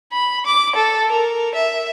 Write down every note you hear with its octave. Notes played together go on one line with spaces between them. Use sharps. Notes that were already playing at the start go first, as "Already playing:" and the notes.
B5
D6
A4
A#4
E5